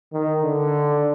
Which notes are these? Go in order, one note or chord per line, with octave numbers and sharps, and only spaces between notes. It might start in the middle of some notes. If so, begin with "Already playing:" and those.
D#3
D3